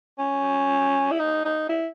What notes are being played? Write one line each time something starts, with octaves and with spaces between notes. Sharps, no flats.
C#4
E4
D#4
D#4
E4